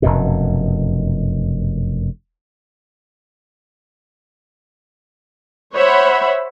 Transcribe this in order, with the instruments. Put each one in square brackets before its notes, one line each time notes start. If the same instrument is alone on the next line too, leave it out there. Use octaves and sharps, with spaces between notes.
[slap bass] F1 F#2 B2
[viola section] C5 C#5 E5 F#5 B5